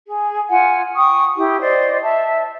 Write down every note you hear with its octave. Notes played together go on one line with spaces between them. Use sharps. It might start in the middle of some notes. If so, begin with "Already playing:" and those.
G#4
F4 F#5 G#5
G5 C#6 D#6
E4 G4
C5 D5 D#5
E5 A5